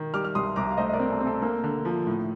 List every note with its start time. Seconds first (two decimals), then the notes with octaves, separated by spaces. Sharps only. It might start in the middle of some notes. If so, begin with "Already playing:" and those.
Already playing: D#3
0.14 G3 D6 F6
0.25 F6
0.35 C2 C6 D#6
0.56 C2 A#5 D6
0.70 F5
0.77 A3 C5 D#5
0.89 D#5
0.93 A#4 D5
0.99 C4
1.10 A4
1.20 C4
1.27 A4
1.42 A#3 A4
1.64 D3
1.85 F3
2.07 A2